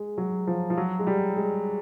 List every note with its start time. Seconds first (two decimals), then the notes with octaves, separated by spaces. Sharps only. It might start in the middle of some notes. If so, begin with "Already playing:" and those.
Already playing: G#3
0.18 F#3
0.47 F3
0.70 F3
0.77 F#3
0.99 G#3
1.07 G3
1.37 G#3